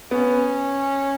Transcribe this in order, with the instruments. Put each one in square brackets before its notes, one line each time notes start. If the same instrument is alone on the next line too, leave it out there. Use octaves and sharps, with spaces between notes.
[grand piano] B3 [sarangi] C#4